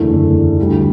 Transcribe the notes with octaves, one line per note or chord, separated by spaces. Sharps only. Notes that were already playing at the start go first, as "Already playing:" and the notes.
Already playing: F#1 E2 D3 A3 E4
D2 D3 G3